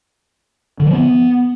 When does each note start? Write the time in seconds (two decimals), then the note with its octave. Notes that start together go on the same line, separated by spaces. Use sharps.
0.80 D3
0.86 F3
0.93 B3